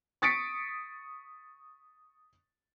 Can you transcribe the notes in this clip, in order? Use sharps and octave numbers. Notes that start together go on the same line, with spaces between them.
C#6 D#6 A6 B6 C#7 D7